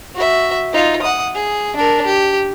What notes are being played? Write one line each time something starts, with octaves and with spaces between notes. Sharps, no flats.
F#4 E5
D#4 F4
F#5 D#6
G#4
D4 A#4
G4